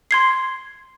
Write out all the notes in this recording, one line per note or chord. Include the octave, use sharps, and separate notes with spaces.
C6 G#6 C7